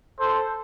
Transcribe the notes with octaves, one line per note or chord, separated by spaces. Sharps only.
A4 C5